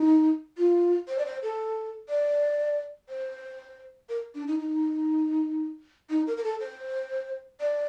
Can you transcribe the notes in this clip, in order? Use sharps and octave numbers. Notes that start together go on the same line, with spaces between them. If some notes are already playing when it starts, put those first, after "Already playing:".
Already playing: D#4
F4
C5
D5
C5
A4
D5
C5
A#4
D4
D#4
D#4
D#4
A#4
A#4
A4
C5
D5